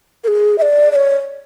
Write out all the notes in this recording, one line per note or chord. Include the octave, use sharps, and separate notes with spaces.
A#4
G#4
E5
D5
D5
C#5